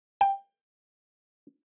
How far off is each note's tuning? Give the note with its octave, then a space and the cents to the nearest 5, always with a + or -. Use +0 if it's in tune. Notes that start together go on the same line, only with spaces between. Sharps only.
G5 +15